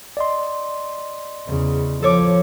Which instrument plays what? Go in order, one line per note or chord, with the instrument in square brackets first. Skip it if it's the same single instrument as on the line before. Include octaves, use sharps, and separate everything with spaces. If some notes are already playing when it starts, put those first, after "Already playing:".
[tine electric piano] D5 D#5 C6
[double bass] E2 C#3
[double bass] F3 [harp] A4 C#5 D6